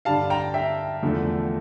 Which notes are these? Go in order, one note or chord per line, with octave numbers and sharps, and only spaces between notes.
G2 D3 G3 F5 A5
G5 A#5
E5 G5
E2 D3 F3 A3